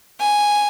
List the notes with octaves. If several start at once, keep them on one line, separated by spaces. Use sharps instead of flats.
G#5